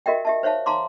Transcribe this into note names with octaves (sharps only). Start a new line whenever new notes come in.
F#4 G4 A#4 D#5 E5 G5
G4 E5 A5
C5 C#5 E5 F5 A5
F5 A5 A#5 C6 D6